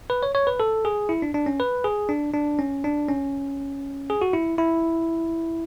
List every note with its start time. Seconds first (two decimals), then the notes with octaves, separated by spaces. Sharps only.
0.10 B4
0.23 C#5
0.35 C#5
0.47 B4
0.60 A4
0.85 G#4
1.09 E4
1.22 D4
1.34 D4
1.46 C#4
1.60 B4
1.84 G#4
2.09 D4
2.34 D4
2.59 C#4
2.84 D4
3.09 C#4
4.10 G#4
4.22 F#4
4.33 E4
4.58 E4